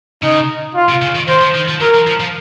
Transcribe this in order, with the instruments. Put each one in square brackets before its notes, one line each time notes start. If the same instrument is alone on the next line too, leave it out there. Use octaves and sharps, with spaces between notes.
[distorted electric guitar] C#3 [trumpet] D#4
[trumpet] F4
[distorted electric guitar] C3
C#3
D#3
[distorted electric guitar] D#3 [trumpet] C5
[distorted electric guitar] F3
D#3
F3
[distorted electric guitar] F#3 [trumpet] A#4
[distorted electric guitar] F3
F3
F3